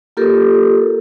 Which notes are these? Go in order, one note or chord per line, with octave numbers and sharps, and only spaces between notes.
A#3 F4 G4 A4 A#4